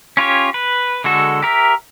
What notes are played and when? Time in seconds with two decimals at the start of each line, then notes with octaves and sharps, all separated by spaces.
0.17 C#4 F4 G4 C#5
0.54 B4
1.04 D3 G#3 F#4 A4
1.42 G4 A#4 E5